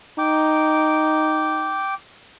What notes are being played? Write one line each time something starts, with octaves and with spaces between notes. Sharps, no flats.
D#4 G5 D6